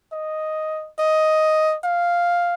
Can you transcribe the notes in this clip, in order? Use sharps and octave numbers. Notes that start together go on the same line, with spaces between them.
D#5
D#5
F5